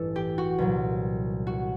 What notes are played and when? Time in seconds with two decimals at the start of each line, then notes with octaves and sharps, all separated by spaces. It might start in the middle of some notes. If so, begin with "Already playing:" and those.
Already playing: A1 G2 E3 A4
0.16 G4
0.38 F#4
0.58 C2 A#2 F#3
1.47 F#4